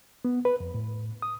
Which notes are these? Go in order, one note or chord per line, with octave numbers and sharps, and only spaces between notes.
B3
B4
F2
A2
D#6